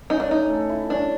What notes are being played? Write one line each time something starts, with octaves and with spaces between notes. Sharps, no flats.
C#4 D#4
D4
A3 D#4
A4
E4
C#4 D4